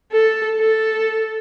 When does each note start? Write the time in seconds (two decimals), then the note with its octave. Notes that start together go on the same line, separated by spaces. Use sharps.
0.12 A4
0.58 A4